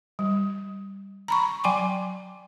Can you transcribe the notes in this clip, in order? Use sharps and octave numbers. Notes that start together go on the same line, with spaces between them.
G3
A#5 B5 C#6
F#3 G5 G#5 C6 D6